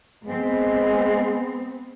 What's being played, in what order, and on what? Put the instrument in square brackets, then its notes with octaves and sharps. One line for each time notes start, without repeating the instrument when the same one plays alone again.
[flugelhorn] G#3 [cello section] B3 C4